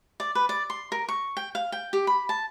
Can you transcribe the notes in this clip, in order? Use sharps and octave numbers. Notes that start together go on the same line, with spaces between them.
D5
B4
D5
C6
A#4
C#6
G5
F5
G5
G4
B5
A5